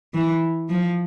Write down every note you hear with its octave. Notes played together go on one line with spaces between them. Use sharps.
E3
F3